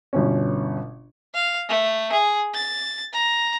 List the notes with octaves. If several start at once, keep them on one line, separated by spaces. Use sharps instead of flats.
G1 B2 C#4
F5
A3
G#4
A6
A#5